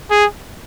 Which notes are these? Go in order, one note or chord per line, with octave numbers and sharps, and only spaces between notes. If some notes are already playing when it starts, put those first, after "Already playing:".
G#4